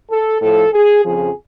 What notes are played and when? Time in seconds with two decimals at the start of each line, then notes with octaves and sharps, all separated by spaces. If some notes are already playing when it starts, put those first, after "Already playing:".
0.10 A4
0.41 A2 F3 A4
0.73 G#4
1.05 F2 C#3 F3 G#4